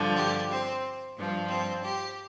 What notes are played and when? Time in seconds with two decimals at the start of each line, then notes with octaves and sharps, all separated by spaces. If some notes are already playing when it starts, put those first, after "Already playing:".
Already playing: G2 D3 F3
0.17 G4
0.51 C4
1.17 G2 F3
1.49 C4
1.83 G4